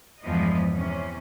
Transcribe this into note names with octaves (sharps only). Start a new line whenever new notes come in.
E2 G2 F3 G#3 B3 D#5
E2 C3 C#4